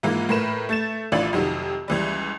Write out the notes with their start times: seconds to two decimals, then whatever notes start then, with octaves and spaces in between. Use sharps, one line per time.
0.03 G#2 E3 A#3 F4
0.29 A2 A#4 B4 E7
0.69 A3 A6 E7
1.12 A1 E3 D4 F4 D5 F#7
1.33 F2 C3 D#3 F#3
1.88 C#2 E3 G3